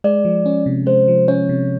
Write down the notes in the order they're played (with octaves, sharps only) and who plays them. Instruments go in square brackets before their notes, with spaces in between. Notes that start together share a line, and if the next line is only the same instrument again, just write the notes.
[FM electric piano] G#3 [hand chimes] D5
[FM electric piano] F3
C#4
C3
[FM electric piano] G#3 [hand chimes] C5
[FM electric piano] F3
[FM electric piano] C#4 [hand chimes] C#5
[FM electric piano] C3